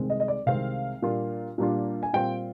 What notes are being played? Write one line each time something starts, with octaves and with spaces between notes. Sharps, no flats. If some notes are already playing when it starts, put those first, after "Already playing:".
Already playing: C2 C3 D#3 G#3 C4
D#5
D#5
D5
C2 C3 D#3 G#3 C4 F5
A#2 G3 A#3 D4 F4
A#2 G3 A#3 D4 F4
G#5
A#2 G3 C4 F4 G5